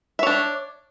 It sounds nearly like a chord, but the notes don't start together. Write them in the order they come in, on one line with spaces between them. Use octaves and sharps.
E5 C#5 D4